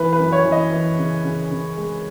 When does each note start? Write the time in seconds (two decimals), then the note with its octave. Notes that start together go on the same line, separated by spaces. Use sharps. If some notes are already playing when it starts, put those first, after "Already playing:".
Already playing: E3 B4
0.13 B4
0.20 F#2
0.32 C#5
0.45 E3
0.52 D#5
0.72 E3
0.99 C#3
1.25 C#3
1.51 C#3
1.77 G#3